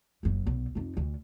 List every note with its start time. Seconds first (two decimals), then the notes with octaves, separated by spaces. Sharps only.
0.23 F#1 F#2
0.47 B1
0.75 F2 D#4
0.97 D2 D3